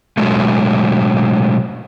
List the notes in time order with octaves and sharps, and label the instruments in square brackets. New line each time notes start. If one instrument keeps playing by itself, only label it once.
[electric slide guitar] B2 F#3 G#3 A3